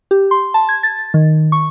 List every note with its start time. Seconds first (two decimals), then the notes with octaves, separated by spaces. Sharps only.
0.11 G4
0.31 C6
0.54 A5
0.69 G#6
0.83 A6
1.14 D#3
1.52 C#6